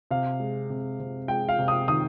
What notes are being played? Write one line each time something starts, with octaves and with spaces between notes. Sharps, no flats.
C3 F5
G#3
C3
C3
G#3 G5
F5
C3
D#6
D#3 D#6